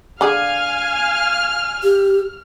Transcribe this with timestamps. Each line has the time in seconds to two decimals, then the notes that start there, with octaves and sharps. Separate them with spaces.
0.21 D3 G#4 F5 G#5 F6
1.83 G4